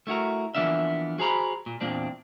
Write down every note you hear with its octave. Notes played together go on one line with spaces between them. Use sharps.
A3 E4 F#4 A#4
E3 F3 A#3 B3 D4 E5
F#4 G#4 C5 A#5 B5
A#2
E2 A#2 A#3 C4 D4